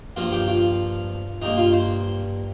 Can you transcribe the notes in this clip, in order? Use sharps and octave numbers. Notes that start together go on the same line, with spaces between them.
G2 F3 A#3 F4
G4
F4
G2 G3 A#3 D#4
F4
C5